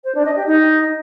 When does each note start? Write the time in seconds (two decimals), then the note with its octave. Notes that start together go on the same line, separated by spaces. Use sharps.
0.04 C5
0.15 D4
0.25 D#5
0.36 G4
0.46 D#4